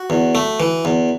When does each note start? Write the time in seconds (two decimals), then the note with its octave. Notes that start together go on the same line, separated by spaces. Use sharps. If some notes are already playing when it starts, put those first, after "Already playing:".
Already playing: F#4
0.10 E2
0.35 A3
0.60 E3
0.85 E2